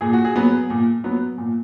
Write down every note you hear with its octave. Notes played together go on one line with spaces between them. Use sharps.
A#2 G#4
F#4
G#4
F#3 B3
A#2
F#3 B3
A#2